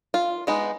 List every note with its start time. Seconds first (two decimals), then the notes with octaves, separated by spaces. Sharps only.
0.14 F4
0.47 G#3 B3 D#4